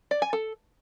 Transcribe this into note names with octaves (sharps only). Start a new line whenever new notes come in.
D5
G#5
A4